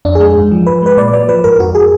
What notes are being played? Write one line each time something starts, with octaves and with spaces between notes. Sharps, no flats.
F2 D4
G#4
G#3
G#2
F3
G#2 B4
G#3 B4
A#2 D5
F#3 D5
F3 B4
G#2 A#4
F2 F#4
G#4